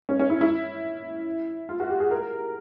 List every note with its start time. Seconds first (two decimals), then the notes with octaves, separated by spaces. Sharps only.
0.09 C#4
0.19 C#4
0.30 E4
0.41 E4
1.69 F4
1.80 F#4
1.90 G4
2.00 G#4
2.11 A#4